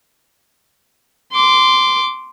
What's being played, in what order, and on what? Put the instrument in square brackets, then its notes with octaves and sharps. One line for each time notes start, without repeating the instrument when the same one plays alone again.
[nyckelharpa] C6 D6